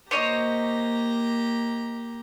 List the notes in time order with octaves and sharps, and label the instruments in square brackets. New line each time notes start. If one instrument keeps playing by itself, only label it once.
[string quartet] A#3 G4 A#5 [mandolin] C5 C#5 D#5